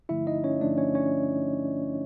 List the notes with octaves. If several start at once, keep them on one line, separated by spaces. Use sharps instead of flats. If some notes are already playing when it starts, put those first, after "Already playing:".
G2 D3 F3 A3 E4 E5
D#4 D#5
C#4 C#5
G2 D3 F3 A3 D4 D5
C#4 C#5
C#4 C#5